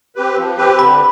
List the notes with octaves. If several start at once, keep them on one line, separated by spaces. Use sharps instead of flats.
C4 G4 B4
F3
C4 G4 B4
D3 B5